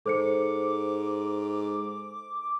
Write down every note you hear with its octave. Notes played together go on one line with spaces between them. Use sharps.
G#2 A4 C5 D6 C#7